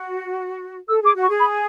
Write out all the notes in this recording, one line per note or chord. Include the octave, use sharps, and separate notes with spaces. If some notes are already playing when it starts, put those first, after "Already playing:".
Already playing: F#4
A4 E6
G#4 D6
F#4
C#6
G#4
B5